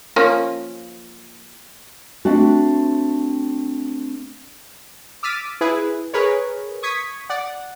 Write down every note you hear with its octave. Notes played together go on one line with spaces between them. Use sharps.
F3 A#3 C#4
A3 C4 D4 F#4
D6 E6 F6 A6 B6 D#7
E4 G#4 B4
G#4 A#4 B4 C#5
C#6 D#6 G#6 B6
D5 F#5